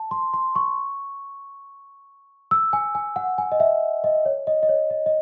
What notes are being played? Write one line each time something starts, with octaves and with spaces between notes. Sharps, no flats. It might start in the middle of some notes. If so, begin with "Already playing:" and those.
Already playing: A5
C6
C6
C#6
E6
G#5
G#5
F#5
G#5
D#5
E5
D#5
C#5
D#5
D#5
C#5
D#5
D#5